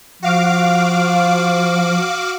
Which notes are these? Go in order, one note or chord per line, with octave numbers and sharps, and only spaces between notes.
F3 F#4 F5 D6